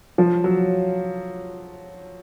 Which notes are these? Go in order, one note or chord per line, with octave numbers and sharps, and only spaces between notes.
F3
F#3